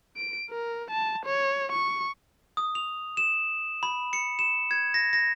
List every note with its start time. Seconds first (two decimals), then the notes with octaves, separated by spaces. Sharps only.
0.17 D7
0.50 A#4
0.91 A5
1.26 C#5
1.72 C#6
2.57 D#6
2.75 F7
3.17 E7
3.83 B5
4.13 C#7
4.39 E7
4.71 G#6
4.94 A#6
5.13 A#6